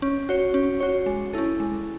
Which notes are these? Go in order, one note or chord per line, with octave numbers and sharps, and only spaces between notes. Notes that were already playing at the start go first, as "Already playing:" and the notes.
C#4
F#4 C#5
C#4
F#4 C#5
G#3
C#4 E4 A4
G#3